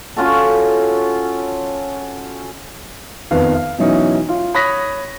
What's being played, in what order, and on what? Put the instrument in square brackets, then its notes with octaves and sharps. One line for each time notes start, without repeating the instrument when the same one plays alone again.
[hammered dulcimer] C#4 F4 F#4 A4
[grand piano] F2 D#3 B3 B4 F5
F5
B2 E3 F#3 C#4 D#4 E4
F4
C#5 B5 D#6 F#6 A#6 B6